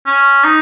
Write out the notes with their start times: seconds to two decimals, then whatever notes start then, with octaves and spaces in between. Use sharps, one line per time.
0.06 C#4
0.44 D#4